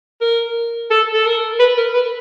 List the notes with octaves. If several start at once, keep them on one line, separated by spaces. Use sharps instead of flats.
A#4
A4
A4
A#4
B4
A#4
B4